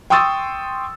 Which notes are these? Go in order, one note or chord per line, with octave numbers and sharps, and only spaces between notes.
G5 C6 C#6 D#6 E6 A6